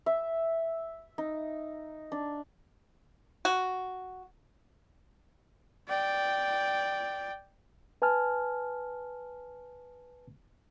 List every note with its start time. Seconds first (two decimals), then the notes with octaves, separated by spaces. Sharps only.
0.06 E5
1.18 D#4
2.12 D4
3.45 F#4
5.89 D5 G5
8.02 B4 G#5 A5 F6